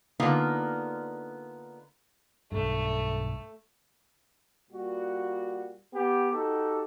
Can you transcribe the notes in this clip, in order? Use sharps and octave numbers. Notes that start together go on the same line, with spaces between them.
D3 A#3 B3 D#4 F4
B1 G2 A3
A#2 G3 F#4
B3 G4
D#4 F#4 G4 A4